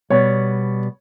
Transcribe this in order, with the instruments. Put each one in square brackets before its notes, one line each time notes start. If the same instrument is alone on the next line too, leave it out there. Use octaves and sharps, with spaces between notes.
[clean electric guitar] B2 G3 B3 [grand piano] C#5